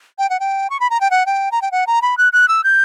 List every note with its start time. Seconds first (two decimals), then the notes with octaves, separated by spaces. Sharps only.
0.18 G5
0.30 F#5
0.40 G5
0.70 C#6
0.80 B5
0.90 A#5
1.01 G5
1.11 F#5
1.26 G5
1.52 A#5
1.62 G5
1.72 F#5
1.87 A#5
2.02 B5
2.17 F#6
2.33 F#6
2.48 E6
2.64 G6